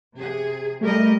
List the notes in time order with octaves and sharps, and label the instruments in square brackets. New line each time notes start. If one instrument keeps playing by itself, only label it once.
[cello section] C3 G#4
[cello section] G3 A#4 D#5 [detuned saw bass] A3